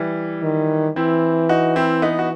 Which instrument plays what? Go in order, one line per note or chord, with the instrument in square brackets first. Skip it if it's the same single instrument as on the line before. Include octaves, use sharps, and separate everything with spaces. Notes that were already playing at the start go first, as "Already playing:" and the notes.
Already playing: [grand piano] E3 G3
[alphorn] D#3
[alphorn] E3 [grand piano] C4 E4
[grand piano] D#4 F#4
C4 E4
B3 D#4
F#4